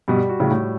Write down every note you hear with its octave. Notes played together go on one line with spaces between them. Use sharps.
G2 B2 G3
F#4
A2 C#3
A2